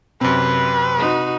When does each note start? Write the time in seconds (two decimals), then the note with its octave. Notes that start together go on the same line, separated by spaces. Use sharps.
0.21 F#2 C3 C4 B4
0.98 D#4 F#4